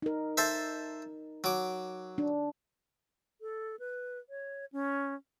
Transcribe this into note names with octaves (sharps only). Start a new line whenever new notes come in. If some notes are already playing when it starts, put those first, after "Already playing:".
D#4 A#4
A4 C5 E5
F#3 D6
D4
A4
B4
C#5
C#4